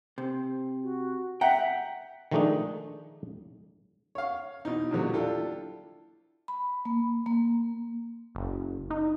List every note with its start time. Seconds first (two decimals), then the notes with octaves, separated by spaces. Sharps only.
0.18 C3
0.83 F#4
1.41 E5 F#5 G5 A#5
2.31 D#3 F3 G#3 A3 D4 D#4
4.15 C#5 F5
4.65 B2 E3 D#4
4.91 E2 A#2 D3 F#3 G3
5.13 D4 E4 F4 G4 A4
6.48 B5
6.85 A#3
7.26 A#3
8.35 F#1
8.90 D#4